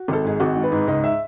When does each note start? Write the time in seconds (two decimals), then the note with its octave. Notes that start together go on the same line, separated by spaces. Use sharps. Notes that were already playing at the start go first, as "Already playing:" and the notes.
Already playing: F#4
0.08 G#1 A4
0.24 G#2 G#4
0.40 G#1 F#4
0.56 G#2
0.63 B4
0.72 G#2
0.87 C#2 D#5
1.04 E5